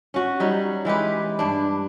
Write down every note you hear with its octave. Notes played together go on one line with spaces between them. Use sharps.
C#4 F#4
F#3 G3 D#4
E3 G#3 G4 B4
G2 D4